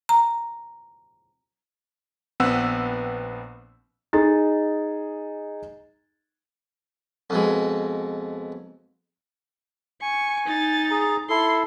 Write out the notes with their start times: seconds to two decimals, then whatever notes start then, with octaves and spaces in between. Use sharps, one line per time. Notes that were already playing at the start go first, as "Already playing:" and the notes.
0.09 A#5
2.40 A#1 B3 C4 B4 F#5 E6
4.13 D#4 G#4 D#5 A6
7.30 F2 B2 G#3
10.02 G#5 C#6
10.46 D#4 A6
10.91 G#4 A#5
11.30 E4 A4 C6